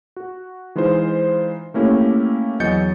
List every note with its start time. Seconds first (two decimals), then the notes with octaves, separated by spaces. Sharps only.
0.16 F#4
0.76 E3 G#3 D#4 F4 C5
1.74 A3 A#3 C#4 E4 G4
2.60 E2 F#3 D#5 G6 A6 C#7